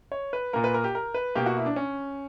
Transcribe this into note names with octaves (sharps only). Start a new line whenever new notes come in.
C#5
B4
A#2 A#3 A#4
B4
A#4
G4
A#4
B4
B2 A#3 G4
F#4
E4
D4
C#4